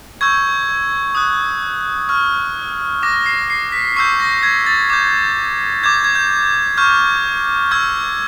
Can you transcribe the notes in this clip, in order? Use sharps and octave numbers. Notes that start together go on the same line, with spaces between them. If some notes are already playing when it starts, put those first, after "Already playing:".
C#6 E6 G6 G#6
D#6 F#6
C#6 F6
D6 F6 A#6
C7
C7
B6
C#6 E6 G6 C7
A#6
G#6
A6
D6 G6
D6 G6 G#6
G#6
G6
C#6 F6 G6
C#6 E6 G6 G#6